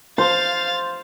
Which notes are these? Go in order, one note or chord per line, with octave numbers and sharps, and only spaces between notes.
C5 F5 A6